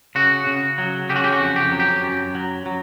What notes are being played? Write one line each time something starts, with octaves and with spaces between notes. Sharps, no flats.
C#3 F#4
C#3
F#3
C#3 G4
F#4
G4
F#4
F2
G4
F#3
G4
F#2
F#3
F#3